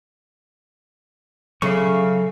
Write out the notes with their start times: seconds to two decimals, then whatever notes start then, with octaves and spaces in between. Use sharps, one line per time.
1.62 C#3 F#3 A4 C#5 E5 F5 C#6